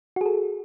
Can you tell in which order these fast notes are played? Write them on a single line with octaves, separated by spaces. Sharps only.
F#4 G#4 A4